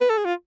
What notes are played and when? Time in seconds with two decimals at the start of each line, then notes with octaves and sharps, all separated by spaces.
0.01 B4
0.10 A4
0.18 G#4
0.25 F4